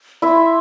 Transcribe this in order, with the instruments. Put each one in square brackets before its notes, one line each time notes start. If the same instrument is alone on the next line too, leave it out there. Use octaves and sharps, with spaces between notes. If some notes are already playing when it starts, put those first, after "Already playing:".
[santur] E4 E5 [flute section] C6